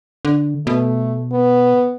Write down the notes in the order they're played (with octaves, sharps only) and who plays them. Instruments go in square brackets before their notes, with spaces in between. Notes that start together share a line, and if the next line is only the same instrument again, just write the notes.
[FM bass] D3
[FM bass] B2 [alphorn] A3
[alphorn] B3